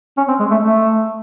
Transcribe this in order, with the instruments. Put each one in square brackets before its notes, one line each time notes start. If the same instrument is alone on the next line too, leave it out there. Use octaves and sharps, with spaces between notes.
[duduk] C#4
C4
G#3
A3
A3